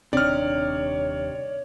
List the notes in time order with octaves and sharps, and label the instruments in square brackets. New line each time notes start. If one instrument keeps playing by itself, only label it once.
[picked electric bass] D#1 D4 [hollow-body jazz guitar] C3 D#4 [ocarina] C#5 [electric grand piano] D5 F6